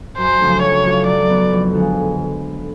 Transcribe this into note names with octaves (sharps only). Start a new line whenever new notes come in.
F#2 C5
C#3 F3 A3 D4
F#3 C#5
A3 D4 F4 A4
F#3 D5
B3 D4
F2
D3 F3 G#3